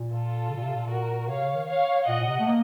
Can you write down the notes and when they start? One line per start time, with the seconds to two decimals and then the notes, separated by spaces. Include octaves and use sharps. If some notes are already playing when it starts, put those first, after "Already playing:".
Already playing: A#2
0.11 F4 A4
0.50 C#3
0.57 A#2
0.63 C3
0.76 A#2
0.90 F#4 A#4
1.29 C3 C#5 F5
1.42 C#3
1.55 D#3
1.68 C#5 F5
2.08 A#2 D#5 F#5
2.21 A#2
2.27 C3
2.40 A3
2.47 A#3